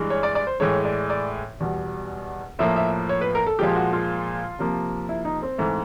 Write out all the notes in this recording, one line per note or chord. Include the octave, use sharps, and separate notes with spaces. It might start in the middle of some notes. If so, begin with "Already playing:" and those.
Already playing: G2 E3 G#3
C#5
D5
D5
C5
A2 E3 G#3 C#5
D5
D5
E2 B2 G3
A2 F3 A#3 E5
E5
C#5
B4
A#4
A4
A#2 F3 G#3 G4
F#4
F4
C3 F3 A#3
E4
D#4
C4
G#2 E3 A3